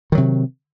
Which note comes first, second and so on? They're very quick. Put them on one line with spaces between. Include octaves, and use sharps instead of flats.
D#3 F#3 C3